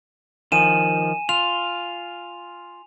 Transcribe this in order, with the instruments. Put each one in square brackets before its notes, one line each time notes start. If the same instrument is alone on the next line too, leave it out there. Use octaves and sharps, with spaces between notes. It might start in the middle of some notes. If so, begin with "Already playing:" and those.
[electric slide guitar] D#3 F3 [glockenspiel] G#5 D#7 E7
[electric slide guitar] F4 [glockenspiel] F7